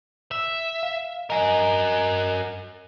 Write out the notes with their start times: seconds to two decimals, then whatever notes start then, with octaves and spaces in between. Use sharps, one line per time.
0.31 E5
0.83 F5
1.30 F#4 A#4 D#5 G#5